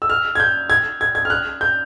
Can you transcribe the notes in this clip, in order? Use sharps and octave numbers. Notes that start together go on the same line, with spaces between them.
E6
F6
G#6
G6
G#6
G#6
G#6
F6
F#6
G6